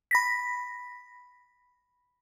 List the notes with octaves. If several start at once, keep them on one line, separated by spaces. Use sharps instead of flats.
B5 A#6 B6